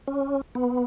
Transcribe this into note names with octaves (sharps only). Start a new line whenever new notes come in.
C#4
B3